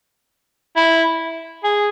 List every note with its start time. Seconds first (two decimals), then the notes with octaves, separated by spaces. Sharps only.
0.76 E4
1.64 G#4